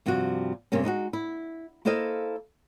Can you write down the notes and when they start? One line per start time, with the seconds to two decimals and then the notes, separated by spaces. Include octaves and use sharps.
0.06 G2 C3 F3 G3 F#4
0.72 G2 C3 A#3 C#4
0.84 G#3 D#4 F4 F#4
1.13 E4
1.85 A#3 E4 A4 C5 D#5 F5